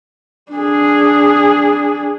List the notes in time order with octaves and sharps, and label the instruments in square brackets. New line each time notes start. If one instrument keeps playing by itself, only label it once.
[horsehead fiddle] D4 G#4